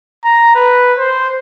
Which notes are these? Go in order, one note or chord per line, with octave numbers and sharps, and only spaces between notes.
A#5
B4
C5